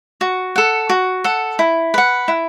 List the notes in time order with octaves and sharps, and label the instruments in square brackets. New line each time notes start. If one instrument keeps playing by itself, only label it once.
[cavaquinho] F#4
A4 F#5
F#4
A4 F#5
E4
B4 F#5
E4